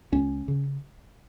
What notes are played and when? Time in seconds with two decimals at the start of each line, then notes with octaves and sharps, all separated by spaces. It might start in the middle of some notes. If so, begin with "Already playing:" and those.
0.12 C#2 C#4
0.48 C#3